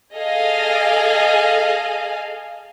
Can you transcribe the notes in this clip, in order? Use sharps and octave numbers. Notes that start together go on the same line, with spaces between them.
G#4 A4 D#5 F5 G#5